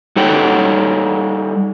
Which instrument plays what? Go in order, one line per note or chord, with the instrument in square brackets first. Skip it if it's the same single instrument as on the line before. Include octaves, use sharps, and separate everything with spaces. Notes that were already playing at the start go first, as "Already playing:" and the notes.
[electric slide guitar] G3 D#4 A4 C#5 F#5 G5